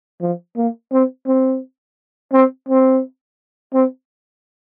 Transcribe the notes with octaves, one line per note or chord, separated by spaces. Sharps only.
F3
A#3
C4
C4
C4
C4
C4